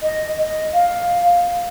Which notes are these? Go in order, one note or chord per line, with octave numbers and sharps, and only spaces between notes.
D#5
D#5
F5